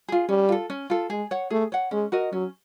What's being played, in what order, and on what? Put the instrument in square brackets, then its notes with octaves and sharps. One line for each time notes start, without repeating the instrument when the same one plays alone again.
[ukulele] F4 G#4
[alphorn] G3 [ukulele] C#4
[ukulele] F4 A4
C#4
F4 A4
[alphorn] G#3 [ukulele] G#4
[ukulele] C#5 F#5
[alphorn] A3 [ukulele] G#4
[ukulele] C#5 F#5
[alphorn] G#3 [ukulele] C#4
[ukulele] F#4 A#4 D#5
[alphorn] F#3 [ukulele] C#4